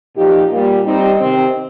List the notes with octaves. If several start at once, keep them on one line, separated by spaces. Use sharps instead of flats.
A#2 F3 D#4 G4
A#2 G3 A#3
G3 C4 D#4
C3 D#3 C4